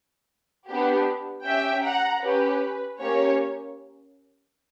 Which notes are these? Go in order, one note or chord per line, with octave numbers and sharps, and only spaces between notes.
B3 D4 G4
C#4 G4 E5 G5
F#5 A#5
C#4 G4 B4
A#3 C#4 G4 C#5